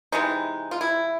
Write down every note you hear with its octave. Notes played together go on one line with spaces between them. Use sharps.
C3 E3 G#3 B3 D#4
F4
E4